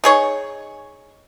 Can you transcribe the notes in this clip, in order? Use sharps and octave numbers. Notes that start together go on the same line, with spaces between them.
D#4 G#4 C#5